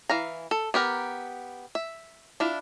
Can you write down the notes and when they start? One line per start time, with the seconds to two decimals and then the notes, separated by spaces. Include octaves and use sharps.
0.09 E3 F5 A#5
0.51 A4
0.74 B3 G4 A#4
1.75 E5
2.40 D4 E4 F4